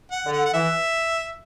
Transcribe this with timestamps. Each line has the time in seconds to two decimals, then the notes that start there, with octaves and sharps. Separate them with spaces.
0.12 F#5
0.26 D3
0.33 F#5
0.46 F#5
0.54 E3 E5